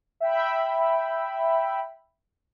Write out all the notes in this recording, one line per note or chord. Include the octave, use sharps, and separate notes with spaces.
E5 G5 B5